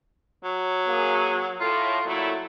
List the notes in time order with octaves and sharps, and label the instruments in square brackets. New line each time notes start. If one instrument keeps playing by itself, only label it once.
[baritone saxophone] F#3
[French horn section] A#3 G#4
[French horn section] A2 [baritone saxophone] F4
[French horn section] A#2 A3 E4 [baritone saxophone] F#3